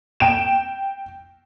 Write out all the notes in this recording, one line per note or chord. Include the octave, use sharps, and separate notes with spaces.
G5 D7 E7